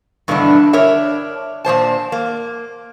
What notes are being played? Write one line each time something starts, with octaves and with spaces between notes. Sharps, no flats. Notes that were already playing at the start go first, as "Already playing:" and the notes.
G2 B2 D3 E3 A3 D4
D4 A#4 C#5 E5
A#2 G3 C5 A5
A#3